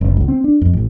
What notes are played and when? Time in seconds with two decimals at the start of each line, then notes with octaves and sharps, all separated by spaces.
0.01 F#1
0.17 C#2
0.28 C4
0.44 D4
0.61 F2
0.73 A1